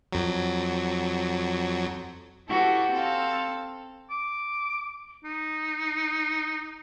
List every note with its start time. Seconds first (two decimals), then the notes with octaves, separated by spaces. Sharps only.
0.13 F2 F#3
2.50 E4 F#4 G4 A4 B4
2.92 C4 A4 F5
4.10 D6
5.24 D#4